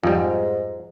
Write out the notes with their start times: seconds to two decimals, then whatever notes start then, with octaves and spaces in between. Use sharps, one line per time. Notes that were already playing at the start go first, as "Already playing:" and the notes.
0.03 F2 G#2 G3